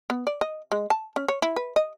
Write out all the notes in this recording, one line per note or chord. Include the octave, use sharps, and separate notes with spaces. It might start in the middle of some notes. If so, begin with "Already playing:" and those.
B3
D5
D#5
G#3
A5
C#4
C#5
E4
B4
D#5